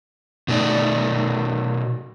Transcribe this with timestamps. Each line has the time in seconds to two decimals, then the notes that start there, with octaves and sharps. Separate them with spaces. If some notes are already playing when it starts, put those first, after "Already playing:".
0.48 B2 A3 D#4 D5